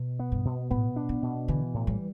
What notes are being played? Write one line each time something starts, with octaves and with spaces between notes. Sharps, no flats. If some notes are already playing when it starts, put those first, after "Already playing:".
Already playing: B2
B3
G2
B2
A2 B3
D4
B2
B2
D3 E3
A2
G3